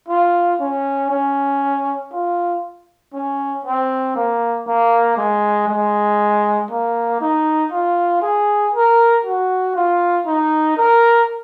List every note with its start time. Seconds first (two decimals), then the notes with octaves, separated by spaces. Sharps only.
0.09 F4
0.60 C#4
1.11 C#4
2.12 F4
3.13 C#4
3.65 C4
4.16 A#3
4.67 A#3
5.17 G#3
5.68 G#3
6.71 A#3
7.21 D#4
7.71 F4
8.22 G#4
8.74 A#4
9.25 F#4
9.75 F4
10.27 D#4
10.77 A#4